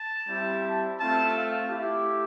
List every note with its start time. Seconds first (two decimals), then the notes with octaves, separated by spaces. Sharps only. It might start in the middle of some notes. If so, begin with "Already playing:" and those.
Already playing: A5
0.28 G3 C4 E4 G4
1.00 A3 C4 F4 A5
1.35 F5
1.70 A3 E4 G4